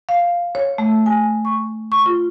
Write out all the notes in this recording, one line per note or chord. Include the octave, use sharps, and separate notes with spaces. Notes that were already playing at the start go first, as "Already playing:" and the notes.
F5
C#5
A3
G#5
C#6
C#6
F4